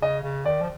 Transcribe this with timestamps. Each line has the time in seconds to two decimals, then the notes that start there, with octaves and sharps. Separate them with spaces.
0.02 C#3 D#5
0.24 C#3
0.45 D#3 D5
0.61 F3